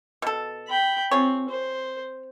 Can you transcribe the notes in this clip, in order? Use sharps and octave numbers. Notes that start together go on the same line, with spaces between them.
B2 A4
G5 B5
C4 F4 G#4 C#5
C5